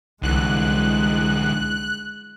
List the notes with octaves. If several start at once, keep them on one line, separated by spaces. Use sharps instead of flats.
C2 D3 E3 G#3 F#6